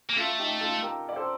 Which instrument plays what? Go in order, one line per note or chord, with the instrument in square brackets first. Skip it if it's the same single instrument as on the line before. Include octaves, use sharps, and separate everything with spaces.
[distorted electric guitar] A#3
[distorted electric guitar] A3 [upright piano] F4 A4
[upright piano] D#4 G4
F4 A4
G4 A#4
D5
A4 C5